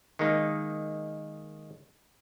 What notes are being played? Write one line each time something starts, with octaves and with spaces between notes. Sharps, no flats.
D#3 G#3 A#3 D#4